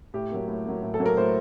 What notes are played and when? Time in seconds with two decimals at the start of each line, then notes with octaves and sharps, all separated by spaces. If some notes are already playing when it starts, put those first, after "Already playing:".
0.14 A2 G4
0.31 F#3 A#3
0.48 A2
0.65 F#3 A#3
0.83 A2
0.94 A4
1.00 F#3 A#3
1.06 A#4
1.17 A2 C5